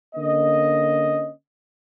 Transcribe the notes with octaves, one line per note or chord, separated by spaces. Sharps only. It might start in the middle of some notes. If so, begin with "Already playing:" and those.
D3 A#3 C#4 D#5